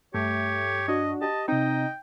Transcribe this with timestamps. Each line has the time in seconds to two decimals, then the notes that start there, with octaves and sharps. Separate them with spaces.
0.14 G2 A3 G4 C#5
0.88 D4 F#4 D#5
1.22 G4 D#5 A5
1.48 C3 C4 D#4 D#5 G5